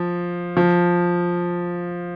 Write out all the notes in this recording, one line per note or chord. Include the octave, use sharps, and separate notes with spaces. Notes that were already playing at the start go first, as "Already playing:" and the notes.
Already playing: F3
F3